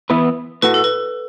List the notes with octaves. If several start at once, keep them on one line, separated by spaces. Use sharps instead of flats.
E3 B3 E4 B4
A2 A3 F#4 B4
A4
B4